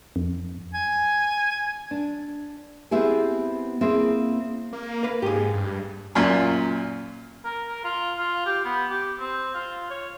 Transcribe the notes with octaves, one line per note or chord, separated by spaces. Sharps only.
F2
G#5
D4
B3 C4 E4 G4 G#4
A#3 C4 E4 G#4
A#3
A#4 B4 F5
G#2 G4 G#4
G2
F#2 A#2
A#4
A#4
F4
F4
G4
B3
G4
C4
F4
C#5